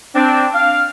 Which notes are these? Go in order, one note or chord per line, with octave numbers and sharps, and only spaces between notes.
C4 D4
F5